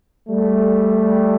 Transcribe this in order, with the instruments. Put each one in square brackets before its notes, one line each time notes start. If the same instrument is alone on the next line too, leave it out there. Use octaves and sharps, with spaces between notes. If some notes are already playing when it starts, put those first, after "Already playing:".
[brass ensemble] G3 A3